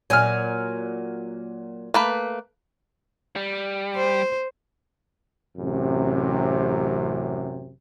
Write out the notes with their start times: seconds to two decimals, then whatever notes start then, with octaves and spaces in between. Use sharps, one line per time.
0.10 A#2 F#3 G#5 F6
1.94 A3 A#3 B4
3.36 G3
3.96 C5
5.58 A1 F#2 C3